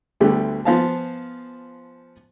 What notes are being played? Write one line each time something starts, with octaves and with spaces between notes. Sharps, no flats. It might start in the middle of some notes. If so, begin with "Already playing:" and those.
D2 D3 G3 A3 B3
F3 B3 C5 F5 G#5 A5